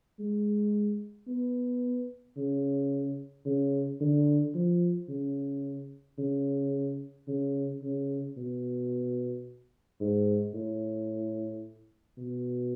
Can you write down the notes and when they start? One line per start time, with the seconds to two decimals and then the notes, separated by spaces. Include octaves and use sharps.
0.19 G#3
1.28 B3
2.37 C#3
3.46 C#3
4.01 D3
4.55 F3
5.09 C#3
6.18 C#3
7.28 C#3
7.82 C#3
8.37 B2
10.00 G#2
10.54 A2
12.17 B2